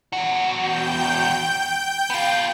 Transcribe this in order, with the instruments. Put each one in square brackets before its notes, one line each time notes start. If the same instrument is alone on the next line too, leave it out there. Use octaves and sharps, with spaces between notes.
[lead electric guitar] E2 F#4
[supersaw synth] G5 G6
[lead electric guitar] B3 F4